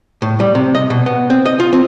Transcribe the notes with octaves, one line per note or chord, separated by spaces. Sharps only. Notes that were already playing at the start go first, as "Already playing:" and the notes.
A2
G3
C3
D#5
B2
B3
C4
D#5
F4
C4